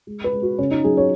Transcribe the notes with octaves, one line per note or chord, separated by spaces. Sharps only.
G#3
B4
G#3
F#4
C#3 C#4
D#4
F#3 G#4
C#5